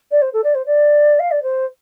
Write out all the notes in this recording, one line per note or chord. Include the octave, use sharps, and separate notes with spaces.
D5
C5
A4
D5
C5
D5
F5
D5
C5